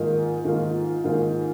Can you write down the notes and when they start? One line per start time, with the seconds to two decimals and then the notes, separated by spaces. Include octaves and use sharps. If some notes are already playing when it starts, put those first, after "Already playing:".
Already playing: G#2 D#3 A#3 F4
0.44 G#2 D#3 A#3 F4
1.04 G#2 D#3 A#3 F4